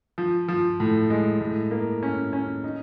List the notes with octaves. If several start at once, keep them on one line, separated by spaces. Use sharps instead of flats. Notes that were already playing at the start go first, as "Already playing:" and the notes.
F3
F3
A2
G#3
A2
A#3
C#4
C#4
D#4